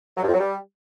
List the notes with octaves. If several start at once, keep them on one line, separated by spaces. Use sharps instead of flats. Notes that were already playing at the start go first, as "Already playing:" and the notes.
F#3
G2
F2
F#3
G3